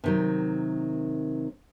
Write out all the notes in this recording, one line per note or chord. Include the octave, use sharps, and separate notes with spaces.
C3 D#3 F#3